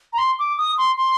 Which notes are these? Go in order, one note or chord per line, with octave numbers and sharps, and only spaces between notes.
A#5
C6
D6
D#6
C6
C6